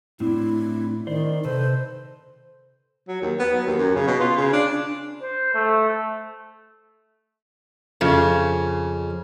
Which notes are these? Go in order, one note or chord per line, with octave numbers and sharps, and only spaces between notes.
A2 C4 D4 E4
D#3 C5 D5
C3 A4 B4 C5
F#3
D#2
B3
F#3
D#2
F#2
C#3
B2
F4
C#3
D4
C5
A3
F2 C#3